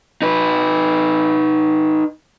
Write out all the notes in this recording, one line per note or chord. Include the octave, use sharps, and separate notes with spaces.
D#4 B4